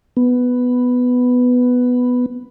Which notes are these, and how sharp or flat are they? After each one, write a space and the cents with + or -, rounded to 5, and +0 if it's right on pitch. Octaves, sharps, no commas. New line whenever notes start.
B3 +5